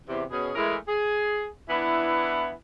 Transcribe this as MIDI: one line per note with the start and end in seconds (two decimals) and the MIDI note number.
0.07 0.22 40
0.07 0.22 48
0.30 0.51 47
0.30 0.51 61
0.30 0.51 68
0.55 0.75 52
0.55 0.75 56
0.55 0.75 57
0.55 0.75 64
0.55 0.75 68
0.55 0.75 70
0.88 1.46 68
1.68 2.51 52
1.68 2.51 59
1.68 2.51 62
1.68 2.51 64